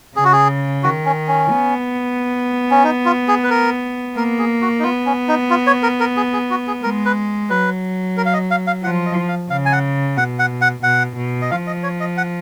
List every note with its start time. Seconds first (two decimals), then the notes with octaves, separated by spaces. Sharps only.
0.16 C#3 G#4
0.25 F#4
0.33 G#4
0.83 D#3 F#4
1.05 C#4
1.28 C#4
1.50 B3
2.71 C#4
2.84 D#4
3.05 F4
3.28 G#4
3.44 B4
3.50 A#4
4.16 A#3 A#4
4.39 G#4
4.62 F#4
4.79 D#4
4.83 B3 F4
5.06 C#4
5.28 D#4
5.50 F4
5.67 C#5
5.83 A#4
6.00 A#4
6.17 G#4
6.33 G#4
6.50 F#4
6.67 G#4
6.83 G#3 A#4
7.06 B4
7.50 F#3 B4
8.17 A#4
8.26 F5
8.33 D#5
8.51 F5
8.67 F5
8.83 F3 F#5
9.06 D#5
9.28 F5
9.50 C#3 F5
9.65 G#5
9.72 F#5
10.17 B2 F#5
10.39 F#5
10.62 F#5
10.83 B2 F#5
11.16 B2
11.42 D#5
11.51 F3 F5
11.67 D#5
11.83 C#5
12.00 D#5
12.17 F#5